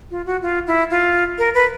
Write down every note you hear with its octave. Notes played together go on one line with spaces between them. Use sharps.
F4
F#4
F4
E4
F4
A#4
B4